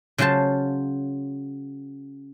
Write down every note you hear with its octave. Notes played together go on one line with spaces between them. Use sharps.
C#3 F#3 F4 C5 A5